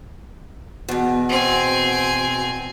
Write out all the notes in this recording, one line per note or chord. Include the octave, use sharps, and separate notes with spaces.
E2 B2
C4 G#5